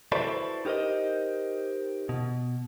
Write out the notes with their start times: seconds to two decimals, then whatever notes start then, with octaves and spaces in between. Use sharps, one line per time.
0.12 E4 F#4 A4 B4 C5 D5
0.65 D#4 G4 A#4 C5 D#5
2.09 B2